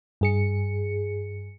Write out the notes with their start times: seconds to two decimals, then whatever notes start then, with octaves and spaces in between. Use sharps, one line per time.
0.21 G2 G#4 C#7